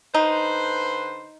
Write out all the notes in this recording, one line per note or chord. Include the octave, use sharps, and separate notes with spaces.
D3 D#4 B4 C5